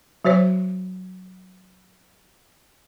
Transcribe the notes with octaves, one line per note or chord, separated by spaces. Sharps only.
F#3 F#4 C5 C#5